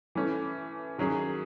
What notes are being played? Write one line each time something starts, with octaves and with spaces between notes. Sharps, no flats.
E3 A3 C#4
D#3 F#3 C#4 G#4